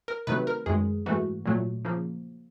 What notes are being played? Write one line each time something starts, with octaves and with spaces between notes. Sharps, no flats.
A#4
C3 D#3 F#3 A3 B4
A#4
F#2 D#3 G#3 G#4
G#2 E3 A3 F#4
A#2 F#3 A3
C#3 F3 A#3